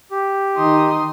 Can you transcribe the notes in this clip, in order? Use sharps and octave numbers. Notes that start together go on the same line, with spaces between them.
G4
D#3 D#4 C6 D#6